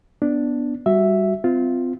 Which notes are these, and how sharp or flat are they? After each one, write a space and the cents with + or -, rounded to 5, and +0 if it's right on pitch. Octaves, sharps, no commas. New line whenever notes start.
B3 +0 D4 +0
G3 +0 F#4 +0 E5 +0
C4 -30 F4 +0